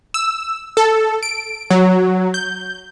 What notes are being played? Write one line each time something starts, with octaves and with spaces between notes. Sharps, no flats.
E6
A4
D7
F#3
G6